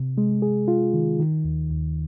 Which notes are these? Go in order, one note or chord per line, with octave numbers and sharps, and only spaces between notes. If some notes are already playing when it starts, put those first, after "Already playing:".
Already playing: C3
G#3
G#4
F4
D#3
D#3
D#2
D#2